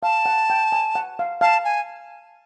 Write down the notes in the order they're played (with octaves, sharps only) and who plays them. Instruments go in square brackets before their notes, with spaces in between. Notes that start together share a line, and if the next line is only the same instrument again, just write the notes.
[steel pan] F5 [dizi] A5
[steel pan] F#5
G5
G#5
F#5
F5
[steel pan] F5 [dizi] A5
[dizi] G#5